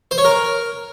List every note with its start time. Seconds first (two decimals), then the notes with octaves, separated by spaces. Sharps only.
0.11 C5
0.18 C#5
0.25 A#4